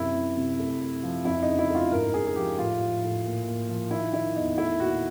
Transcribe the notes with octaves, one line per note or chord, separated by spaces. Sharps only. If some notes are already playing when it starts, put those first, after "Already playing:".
Already playing: F#2 C3 E4
C3
C3
A3
A3
F3
F2 E4
C#3 D#4
E4
A3
F4
G#2 A#4
G#2 G#4
G#4
F3 G4
A2 F4
F3
A2
A#2
A#2
F3
D#3 E4
D#3 E4
E2 D#4
A3 E4
A#2 F#4